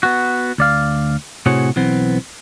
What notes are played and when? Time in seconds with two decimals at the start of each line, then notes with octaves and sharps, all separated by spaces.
0.03 B3 F#4
0.58 D2 D5 F5
1.46 A2 C3 F#4 G#4 C5 C#5
1.76 B1 E3 B3 C4